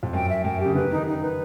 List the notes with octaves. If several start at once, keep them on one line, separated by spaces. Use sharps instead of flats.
F2
F#2 G5
E5
F#2 G5
G4
C#3
D3 B4
D#3 D#4
D#4
B4